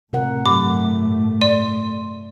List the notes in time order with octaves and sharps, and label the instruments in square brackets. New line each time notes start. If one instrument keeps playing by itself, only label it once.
[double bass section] A2 A3 [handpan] C3 A#4 F#5
[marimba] G2 F#3 [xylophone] D6
[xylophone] D5 C6 D#7